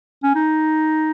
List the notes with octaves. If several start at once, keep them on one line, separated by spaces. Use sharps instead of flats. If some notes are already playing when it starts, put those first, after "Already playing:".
C#4
D#4